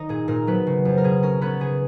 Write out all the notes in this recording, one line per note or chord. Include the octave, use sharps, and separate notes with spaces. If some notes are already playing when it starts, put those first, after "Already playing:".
Already playing: D#3 D#4 D#5
A#2 G#4
A#2 A#4
F#3 B3 B4
C#3
F2
A#4
B2 G#4
C#4 A#4
B3 C#4 B4
C#3 G#4